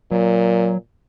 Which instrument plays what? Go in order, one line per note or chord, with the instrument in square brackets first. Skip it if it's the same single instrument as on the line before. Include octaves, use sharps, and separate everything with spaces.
[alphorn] A#2 [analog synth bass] F#3